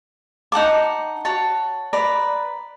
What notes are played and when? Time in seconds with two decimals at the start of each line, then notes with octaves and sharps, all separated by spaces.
0.52 D#4 F#5 A5 D6
1.25 F#4 C#5 A5
1.93 B4 D5 A#5